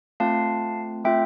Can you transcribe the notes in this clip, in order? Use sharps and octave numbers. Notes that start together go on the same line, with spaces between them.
A3 C4 F4 F5 A5
A3 C4 F4 E5 G5